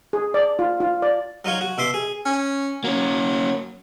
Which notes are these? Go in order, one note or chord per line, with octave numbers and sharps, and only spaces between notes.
G#4
D5
F4
F4
D5
F#3 D#4 F4 C#5
F#4
B2 E5 C6 D6
G#4
C#4
F#3 A#3 C#4